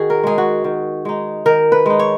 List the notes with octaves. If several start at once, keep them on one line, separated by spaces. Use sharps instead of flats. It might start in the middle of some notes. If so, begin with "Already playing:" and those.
Already playing: D#3 F#4 G#4
A#4
G#3 D#4 G#4
F#4
D#3
G#3 D#4
D#3 A#4
B4
G#3 D#4
C#5